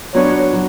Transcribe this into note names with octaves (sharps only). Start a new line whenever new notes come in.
F#3 B3 D4 C#5
F#3